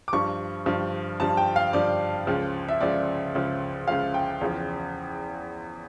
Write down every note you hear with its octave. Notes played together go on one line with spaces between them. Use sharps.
D6
G2 F3 C#6
G2 F3
G2 F3 A5
G5
F5
G2 F3 D5
C#2 C#3 F3
E5
C#2 C#3 F3 D5
C#2 C#3 F3
C#2 C#3 F3 F5
G5
E2 C#3 F3